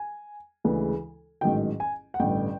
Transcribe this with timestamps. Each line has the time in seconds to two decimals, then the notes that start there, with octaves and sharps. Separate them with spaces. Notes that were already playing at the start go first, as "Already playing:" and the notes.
Already playing: G#5
0.64 D2 C#3 E3 G#3
1.41 A1 G#2 D#3 F#3 G5
1.80 G#5
2.14 F#5
2.20 A1 G2 D3 G5